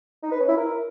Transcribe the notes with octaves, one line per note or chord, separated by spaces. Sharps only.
D#4
B4
C#4
E4
A#4